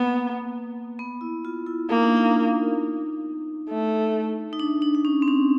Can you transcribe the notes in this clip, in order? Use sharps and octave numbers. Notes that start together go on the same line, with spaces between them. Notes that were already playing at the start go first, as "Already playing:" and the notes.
Already playing: A#3 B3
B3
E4
F4
E4
A#3 D#4
D4
D#4
A3
D#4
D4
D4
D4
C#4
C4
C#4